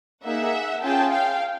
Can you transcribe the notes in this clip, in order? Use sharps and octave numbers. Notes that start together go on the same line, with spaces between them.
A#3 D#4 G#4 E5 F#5
C#4 F4 G#4 G5 A5
F5 G5